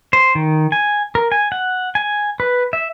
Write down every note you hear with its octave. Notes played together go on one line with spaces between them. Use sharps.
C5
D#3
G#5
A#4
G#5
F#5
G#5
B4
E5